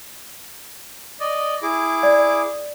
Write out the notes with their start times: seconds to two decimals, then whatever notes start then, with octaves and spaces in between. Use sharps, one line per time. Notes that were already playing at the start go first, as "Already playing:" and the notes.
1.20 D5 D#5
1.62 E4 G#4 D6
2.03 D5